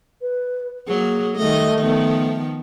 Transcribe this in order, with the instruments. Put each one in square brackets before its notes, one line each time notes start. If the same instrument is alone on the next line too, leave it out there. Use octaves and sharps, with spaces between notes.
[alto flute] B4
[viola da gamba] F#3 A#3 [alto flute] G#4
[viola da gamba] D#3 G3 D#5 [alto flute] A3
[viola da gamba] D#3 F3 B3